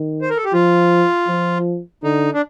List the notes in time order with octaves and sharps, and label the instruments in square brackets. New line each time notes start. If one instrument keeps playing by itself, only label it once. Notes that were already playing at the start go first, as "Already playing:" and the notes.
Already playing: [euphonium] D#3
[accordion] C5
A#4
A4
G4
[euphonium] F3 [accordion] F4
[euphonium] F3
[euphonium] D3 [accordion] D#4
[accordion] D4